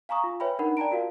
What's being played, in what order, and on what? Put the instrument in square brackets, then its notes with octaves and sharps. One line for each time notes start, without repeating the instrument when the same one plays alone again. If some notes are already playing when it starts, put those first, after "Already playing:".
[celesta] F5 G#5 A#5 C#6 D#6
F4
B4 C#5 E5 G5 G#5 B5
D4 D#4 A#4 F#5 B5
D5 G5 A5 A#5 D7
F4 F#4 A#4 F5